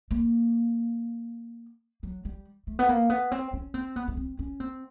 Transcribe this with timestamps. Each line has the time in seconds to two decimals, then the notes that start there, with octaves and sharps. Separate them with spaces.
0.11 A#3
2.03 F#3
2.25 G3
2.67 A3
2.79 B3
2.89 A#3
3.10 B3
3.32 C4
3.53 C#4
3.74 C4
3.96 B3
4.08 B3
4.17 C4
4.39 C#4
4.60 C4